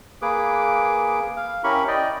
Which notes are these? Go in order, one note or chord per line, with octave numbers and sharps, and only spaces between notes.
A#3 G#4 B4 D6
F5
C#4 E4 G4 A#4 B5 C#6
D5 D#5 G5